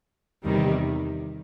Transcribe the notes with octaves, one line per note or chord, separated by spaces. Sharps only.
E2 C3 D#3 G3